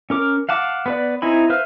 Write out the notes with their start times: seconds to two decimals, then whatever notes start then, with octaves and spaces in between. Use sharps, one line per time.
0.10 C#4 A#4 D6
0.49 F5 F#5 A5 D6
0.86 B3 B4 D5
1.22 C4 D#4 E4 G#5 B5
1.50 B4 C5 E5 F5 F6